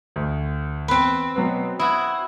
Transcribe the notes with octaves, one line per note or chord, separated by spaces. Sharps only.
D2
E2 C4 B4
B2 F#3 B3
E4 F#4 D#6 G#6